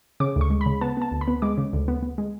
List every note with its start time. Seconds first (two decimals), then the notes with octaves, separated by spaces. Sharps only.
0.20 C#3 D6
0.36 D2
0.41 C#6
0.50 G#3
0.61 B5
0.66 C#3
0.81 B3 A5
0.97 B3 A5
1.11 D2
1.21 B5
1.28 B3
1.42 G#3 D6
1.58 C#3
1.73 D2
1.88 B3
2.03 B3
2.18 G#3